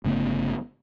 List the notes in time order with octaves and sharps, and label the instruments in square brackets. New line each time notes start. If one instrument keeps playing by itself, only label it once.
[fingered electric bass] G1 C#3 A3 B3